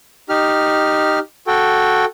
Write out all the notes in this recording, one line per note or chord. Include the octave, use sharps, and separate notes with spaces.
D#4 G4 F6
F#4 A4 G5